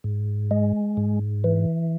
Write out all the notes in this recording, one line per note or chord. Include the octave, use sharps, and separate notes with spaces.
G#2
G#3
G#2
E3